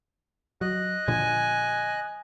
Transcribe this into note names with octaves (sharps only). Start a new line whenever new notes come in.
F#3 D#5 F#6
A#2 D3 F3 G#5